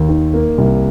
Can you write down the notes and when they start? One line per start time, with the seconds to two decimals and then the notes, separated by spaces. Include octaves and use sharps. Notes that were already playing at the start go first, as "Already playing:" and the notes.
Already playing: D#2
0.09 D#3
0.34 A#3
0.58 C2